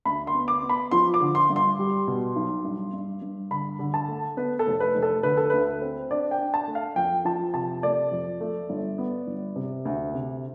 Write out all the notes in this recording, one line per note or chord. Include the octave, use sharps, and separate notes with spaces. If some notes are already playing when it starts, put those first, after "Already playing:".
D2 B5
C6
B3
D6
B3
B5
F3 C6
D6
D3
C6
G2
C6
G3
B2
B1
G2
G2
G2
D3 B5
D3
A5
A3
B3 B4
A4
F1
B4
F1
A4
D3 B4
A4
D2 B4
C4
D4 D5
G5
D4
A5
A3
F5
F2 G5
F3 A5
C3 A5
A3 D5
F2
A3
G1
B3
G1
C3
D2
C3